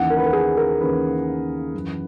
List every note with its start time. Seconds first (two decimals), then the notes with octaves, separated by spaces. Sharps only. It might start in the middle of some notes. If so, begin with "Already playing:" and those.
Already playing: D#2 C#3 E3 F#5
0.10 A#4
0.18 B4
0.26 A#4
0.33 G#4
0.57 A#4
0.80 D#2 C#3 E3 B4
1.74 F#2 E3